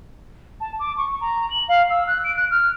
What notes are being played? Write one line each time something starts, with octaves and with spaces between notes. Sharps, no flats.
A5
D6
C#6
A#5
F#7
F5
E6
F#6
D7
F#6
F6